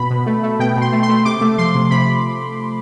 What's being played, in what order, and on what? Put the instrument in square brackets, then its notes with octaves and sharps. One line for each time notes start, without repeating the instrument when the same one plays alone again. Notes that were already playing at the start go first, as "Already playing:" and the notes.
Already playing: [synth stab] B2 B5
B2
A3
A3
B2 G5
B2
C6
A3
C6
A3
C3 D6
A3
F3 C6
C3
C3 B5